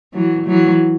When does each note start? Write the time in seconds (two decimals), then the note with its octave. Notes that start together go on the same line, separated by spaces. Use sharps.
0.13 E3 F#3
0.46 E3 F#3